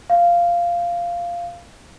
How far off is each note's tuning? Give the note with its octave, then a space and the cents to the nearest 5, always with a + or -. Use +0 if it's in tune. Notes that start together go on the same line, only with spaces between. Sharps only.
F5 -10